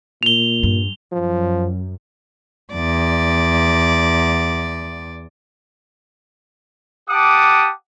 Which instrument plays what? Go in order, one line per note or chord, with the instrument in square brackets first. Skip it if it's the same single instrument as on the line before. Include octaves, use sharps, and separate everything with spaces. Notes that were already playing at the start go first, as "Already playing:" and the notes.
[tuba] A#2 [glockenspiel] F7 G7
[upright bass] G2
[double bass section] F#2 [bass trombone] F3
[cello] E2 D5
[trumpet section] G4 F#5 A5 D6 D#6